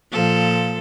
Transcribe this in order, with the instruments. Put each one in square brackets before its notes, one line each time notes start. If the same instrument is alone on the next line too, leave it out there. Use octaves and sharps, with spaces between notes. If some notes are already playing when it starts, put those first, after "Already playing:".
[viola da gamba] A#2 F3 A4